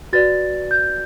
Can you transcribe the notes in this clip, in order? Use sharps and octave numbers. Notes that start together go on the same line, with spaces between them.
F#4 B4 D5 A6
G6